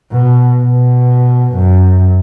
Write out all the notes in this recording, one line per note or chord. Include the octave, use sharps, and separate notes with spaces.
B2
B2
F#2